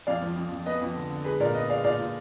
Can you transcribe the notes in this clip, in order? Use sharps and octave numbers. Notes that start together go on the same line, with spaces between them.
F2 D5 F5
F3
F2
F2
B3 B4 D#5
F2
D3
D3
G#3 G#4 B4
A#2 A#4 D5
B3 B4 D#5
G#3 D5 F5
A#2 D5 F5
A#2